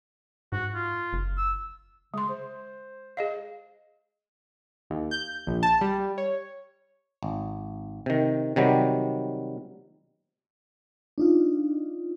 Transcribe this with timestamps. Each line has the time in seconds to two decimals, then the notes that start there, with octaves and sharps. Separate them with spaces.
0.52 G#2 F#4
0.74 F4
1.13 F#1
1.38 E6
2.14 C#3 G#3 C6
2.29 C5
3.17 G#4 D#5 F5
4.90 D#2
5.11 G6
5.47 A#1
5.63 A5
5.81 G3
6.18 C#5
7.23 G#1
8.06 C3 D#3
8.56 C3 D#3 F#3 G3
11.18 D4 D#4 F4